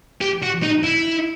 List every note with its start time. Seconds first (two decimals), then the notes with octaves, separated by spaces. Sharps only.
0.21 G4
0.43 F#4
0.63 D#4
0.84 E4